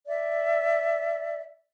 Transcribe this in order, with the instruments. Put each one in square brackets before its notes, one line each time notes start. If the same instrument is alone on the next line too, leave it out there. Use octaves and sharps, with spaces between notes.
[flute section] D5 E5